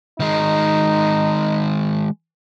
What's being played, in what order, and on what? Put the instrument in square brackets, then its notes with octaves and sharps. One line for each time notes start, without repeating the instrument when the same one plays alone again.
[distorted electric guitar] D#3 G#3 [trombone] D#4